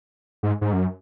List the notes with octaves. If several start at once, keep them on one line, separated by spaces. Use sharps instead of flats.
G#2
G#2
F#2